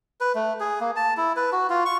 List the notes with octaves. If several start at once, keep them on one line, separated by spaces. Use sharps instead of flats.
B4
A3
G#4
A#3
A5
E4
B4
F#4
F4
C#6